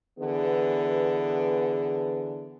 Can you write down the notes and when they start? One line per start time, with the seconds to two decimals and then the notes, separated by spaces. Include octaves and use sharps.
0.19 D3 E3 B3 G#4